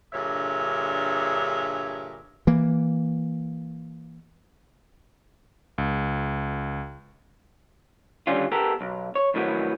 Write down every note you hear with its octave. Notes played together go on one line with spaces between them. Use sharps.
G2 A#2 D3 G#4 C#5 E5
E3 A#3
C#2
D3 D#3 F#3 G3 C#4 F4
B3 G4 A4 A#4
B1
C#5
F2 A2 D#3 F#3 B3